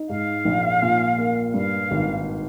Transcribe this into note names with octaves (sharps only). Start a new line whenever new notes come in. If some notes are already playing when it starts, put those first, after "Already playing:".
Already playing: D#4
G#2 F5
A#1
A#2
A#3
G2 F5
G#1